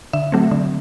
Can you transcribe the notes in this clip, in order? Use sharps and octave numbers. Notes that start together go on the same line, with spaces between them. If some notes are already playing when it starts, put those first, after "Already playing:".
D3 E5
F#3 A3 C4
D3